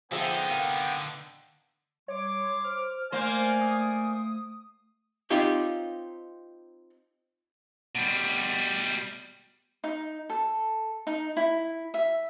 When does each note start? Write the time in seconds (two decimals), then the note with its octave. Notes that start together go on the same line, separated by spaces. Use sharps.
0.12 D3 F3 B3 D#4 G#4 E5 G5
0.50 A#4 F5
2.08 G3 C#5 C6 D6
2.64 C5 F6
3.12 A3 A#3 C5 D5 G#5
3.61 D#6
5.31 C4 D#4 F4 G4 C#5
7.95 B2 G3
9.84 D#4
10.30 A4
11.07 D#4
11.37 E4
11.94 E5